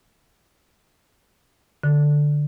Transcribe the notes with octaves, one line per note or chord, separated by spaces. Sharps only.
D3